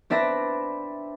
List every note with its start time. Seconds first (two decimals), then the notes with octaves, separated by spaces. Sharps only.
0.10 C4 D4 B4 E5 B5 A#6